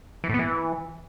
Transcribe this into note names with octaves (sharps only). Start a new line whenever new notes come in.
E3
A2
B3
E3